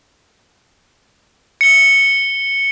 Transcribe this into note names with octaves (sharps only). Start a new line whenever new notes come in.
C#7 G7